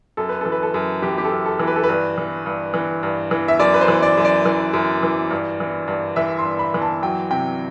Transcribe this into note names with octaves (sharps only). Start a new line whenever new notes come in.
F#2 A4
B4
E3 A4
B4
A4
F#2
E3 G4
G4
A4
F#2
A4
E3
B4
A4
B4
G2
E3
G2
E3
G2
E3
E5
F#2 D5
B4
C5
E3
D5
F#2
D5
E3
F#2
E3
G2
E3
G2
E3 E5
C6
G2
B5
E3
A5
F#3 G5
C3 G5